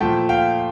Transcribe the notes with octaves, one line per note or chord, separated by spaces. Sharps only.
A#2 F3 A3 G5 A5
F5 G5